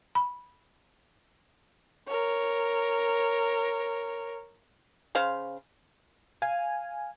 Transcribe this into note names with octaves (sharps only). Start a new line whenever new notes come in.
B5
A#4 C#5
C#3 C5 F5
F5 G#5